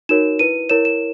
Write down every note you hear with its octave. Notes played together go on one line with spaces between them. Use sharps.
D#4 F#4 A#4 C#5 E7
E4 B4 D#7
E4 A#4 C#5 E7
E7